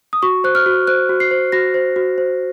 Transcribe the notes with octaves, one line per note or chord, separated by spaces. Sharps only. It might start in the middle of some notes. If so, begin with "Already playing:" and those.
D#6
F#4 C#6
C5 F#6
F6
F#4
C5 F#6
F#4
C7
C5
F#4 A#6
C5
F#4
C5